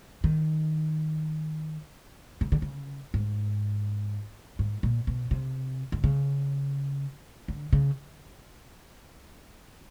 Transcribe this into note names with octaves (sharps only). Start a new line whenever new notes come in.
D#3
C#3
D3
C#3
G#2
G#2
A#2
B2
C3
D3
C#3
D3
C#3